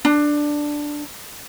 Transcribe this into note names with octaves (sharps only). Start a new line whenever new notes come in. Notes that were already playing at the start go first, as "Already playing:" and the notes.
D4